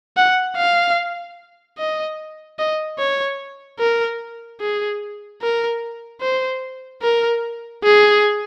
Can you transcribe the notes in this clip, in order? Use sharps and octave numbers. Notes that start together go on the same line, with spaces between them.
F#5
F5
D#5
D#5
C#5
A#4
G#4
A#4
C5
A#4
G#4